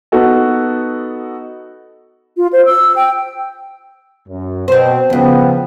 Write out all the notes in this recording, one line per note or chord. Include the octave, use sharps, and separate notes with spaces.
B3 D#4 F#4 A4
F4
C5
E6
G5
F#2
B2 C4 C5
E2 G2 C#3 F3 B3